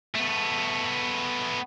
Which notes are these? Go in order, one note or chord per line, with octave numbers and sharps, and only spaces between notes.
A3 B3